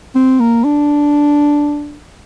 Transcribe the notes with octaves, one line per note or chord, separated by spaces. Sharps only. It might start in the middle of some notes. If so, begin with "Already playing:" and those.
C4
A#3
D4